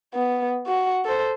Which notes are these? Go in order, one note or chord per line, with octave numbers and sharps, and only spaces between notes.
B3
F#4 F#5
A4 C5